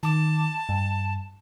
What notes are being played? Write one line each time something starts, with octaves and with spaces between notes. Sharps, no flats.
D#3 A5 D6
G2